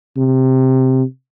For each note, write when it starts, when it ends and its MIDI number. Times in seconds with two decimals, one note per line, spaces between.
0.17 1.03 48